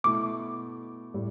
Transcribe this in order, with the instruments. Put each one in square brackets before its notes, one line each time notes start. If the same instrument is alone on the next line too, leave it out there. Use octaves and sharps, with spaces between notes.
[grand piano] B2 A3 E4 [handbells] D6
[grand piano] A2 G3